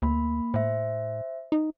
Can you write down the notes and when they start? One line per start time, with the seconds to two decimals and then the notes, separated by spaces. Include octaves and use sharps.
0.02 D2 A#3 B5
0.54 A2 C5 E5
1.52 D#4